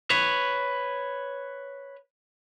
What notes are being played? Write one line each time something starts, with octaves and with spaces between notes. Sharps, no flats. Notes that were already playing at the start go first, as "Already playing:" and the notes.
B4 C#5